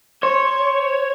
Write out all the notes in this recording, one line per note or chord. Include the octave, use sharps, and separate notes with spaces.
C5 C#5